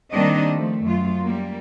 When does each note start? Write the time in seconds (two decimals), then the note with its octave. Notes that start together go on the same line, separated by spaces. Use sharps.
0.11 D#3 G3 A#3 C4 D4 D#5
0.52 F3 A3
0.84 F#2 F4
1.22 G3 A#3